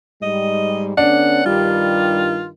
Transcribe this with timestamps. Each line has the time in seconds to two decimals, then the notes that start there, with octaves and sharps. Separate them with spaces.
0.22 G#2 G3 D#5
0.97 D3 B3 C#4 D4 F#5
1.46 G2 D#3 G3 F4